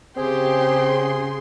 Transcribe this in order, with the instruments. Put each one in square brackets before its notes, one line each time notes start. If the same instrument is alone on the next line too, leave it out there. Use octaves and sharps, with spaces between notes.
[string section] C#3 C6 [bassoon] C4 [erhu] G4 [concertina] G#4